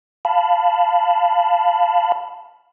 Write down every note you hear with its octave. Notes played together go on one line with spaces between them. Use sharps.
F5 A5 B5